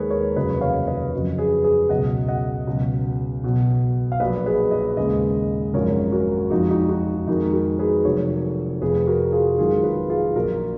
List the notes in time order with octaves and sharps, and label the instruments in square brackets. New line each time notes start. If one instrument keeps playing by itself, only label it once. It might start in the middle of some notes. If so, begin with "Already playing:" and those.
Already playing: [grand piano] D#2 D#3 G#3 G#4 A#4 B4 C#5
A#4 C#5
F1 D#2 C#3 F#3 B4 D#5
C#5 F5
B4 D#5
F2 C#3 F#3
G#4 B4
G#4 B4
C#2 B2 F#3 D#5 F#5
D#5 F#5
C#2 B2 F#3
B1 B2 F#3
F5
A#1 A#2 F#3 B4 D#5
G#4 B4
B4 D#5
D#2 C#3 G#3 B4 D#5
G#1 F#2 F3 G#3 A#4 C#5
F#4 A#4
F2 F3 G#3 D#4 F#4
D#4 F#4
D#4 F#4
F2 D#3 G#3 D#4 F#4
F#4 A#4
G#4 B4
F1 F2 D#3 F#3 A#4 C#5
F1 F2 F3 G#4 B4
F#4 A#4
F4 G#4
G#1 G#2 D#3 F#3 F4 G#4
G#4 B4
F4 G#4
A#1 A#2 F#3 F#4 A#4